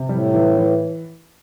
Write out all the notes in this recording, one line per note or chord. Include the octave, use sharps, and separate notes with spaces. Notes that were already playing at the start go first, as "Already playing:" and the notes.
Already playing: C3
A2 G3
E3
E3